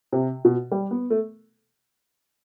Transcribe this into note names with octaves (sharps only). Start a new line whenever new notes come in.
C3
B2
G3
B3
A3